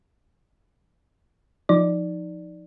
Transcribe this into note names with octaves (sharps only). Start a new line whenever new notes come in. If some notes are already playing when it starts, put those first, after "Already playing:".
F3 D#4 D5